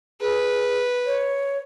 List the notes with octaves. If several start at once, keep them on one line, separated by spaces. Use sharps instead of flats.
G#4 B4
C#5